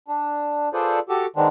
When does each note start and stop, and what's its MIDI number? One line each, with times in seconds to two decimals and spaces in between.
0.08 0.69 62
0.73 0.99 65
0.73 0.99 68
0.73 0.99 69
0.73 0.99 71
0.73 0.99 72
0.73 0.99 74
1.09 1.26 66
1.09 1.26 67
1.09 1.26 69
1.36 1.48 51
1.36 1.48 56
1.36 1.48 59
1.36 1.48 60
1.36 1.48 62